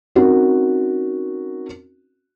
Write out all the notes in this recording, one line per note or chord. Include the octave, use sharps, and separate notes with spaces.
C4 C#4 D#4 F#4 A#4